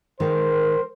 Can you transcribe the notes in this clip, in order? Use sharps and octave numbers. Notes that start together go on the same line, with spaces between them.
D#3 G#3 A#4 C5